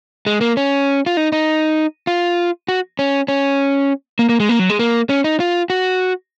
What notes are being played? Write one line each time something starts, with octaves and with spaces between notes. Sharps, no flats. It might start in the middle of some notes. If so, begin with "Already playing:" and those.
G#3
A#3
C#4
F4
D#4
D#4
F4
F#4
C#4
C#4
A#3
A#3
G#3
A#3
F#3
G#3
A#3
C#4
D#4
F4
F#4